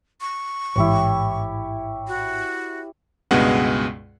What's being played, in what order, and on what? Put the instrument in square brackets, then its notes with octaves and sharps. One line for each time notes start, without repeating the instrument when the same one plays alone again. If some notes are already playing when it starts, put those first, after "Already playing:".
[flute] C#6
[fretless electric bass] A1 G#2 E3 [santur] E4 G4 C#5
[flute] F#4
[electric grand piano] C#2 G2 B2 G#3 B3 F#5